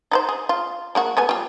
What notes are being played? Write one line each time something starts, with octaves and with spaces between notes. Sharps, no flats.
D#4 B4 C5
G#4
F4
G#3 A#3 F#4
A3 B3 G#5
G3 F4